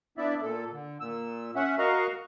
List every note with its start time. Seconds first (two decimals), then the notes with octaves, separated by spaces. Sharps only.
0.18 B3 D4 E4 D5 E5
0.43 A#2 A4
0.72 D3
1.00 A#2 E6
1.56 C#4 E5 F#5
1.79 F#4 A#4 D#5 F5 A#5 C#6